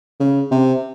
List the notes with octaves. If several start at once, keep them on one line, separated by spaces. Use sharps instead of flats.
C#3
C3